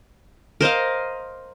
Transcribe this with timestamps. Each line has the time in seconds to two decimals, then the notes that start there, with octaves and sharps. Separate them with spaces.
0.61 A#4 C5 D#5 F5